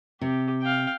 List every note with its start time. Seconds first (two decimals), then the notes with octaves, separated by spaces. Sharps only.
0.21 C3 G4
0.62 F5 G5